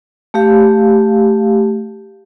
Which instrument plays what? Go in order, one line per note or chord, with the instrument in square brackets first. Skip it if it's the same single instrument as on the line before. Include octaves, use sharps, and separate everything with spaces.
[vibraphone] A3 G4 F5